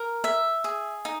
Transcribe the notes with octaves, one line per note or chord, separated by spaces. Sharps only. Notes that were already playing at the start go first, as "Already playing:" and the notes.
Already playing: A#4
E5
G#4
D#4